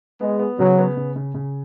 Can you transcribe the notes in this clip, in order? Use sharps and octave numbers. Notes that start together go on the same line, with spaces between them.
G#3 B3
B3
C#3 F#3
B3
C#3
C#3
C#3